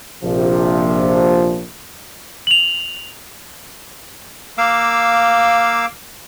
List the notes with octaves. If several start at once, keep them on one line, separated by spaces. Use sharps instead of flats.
A#1 C3 F3
F7 F#7
A#3 F5 D6 E6